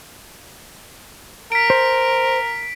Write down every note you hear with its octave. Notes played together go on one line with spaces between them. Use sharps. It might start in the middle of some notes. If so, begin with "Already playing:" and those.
A#4 B6 D7
C5